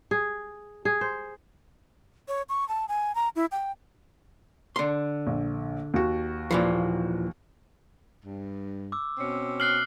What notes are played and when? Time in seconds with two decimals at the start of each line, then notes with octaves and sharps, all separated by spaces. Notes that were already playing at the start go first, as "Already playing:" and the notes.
0.11 G#4
0.85 G#4
1.01 C5
2.28 C#5
2.49 C#6
2.69 A5
2.88 G#5
3.15 A#5
3.36 E4
3.52 G5
4.76 D3 C6
5.27 A#1
5.94 D#2 F#4
6.51 A#2 E3 F3
8.25 G2
8.92 D6 E6
9.18 B2 C4 C#4
9.60 F6 F#6 C7 F#7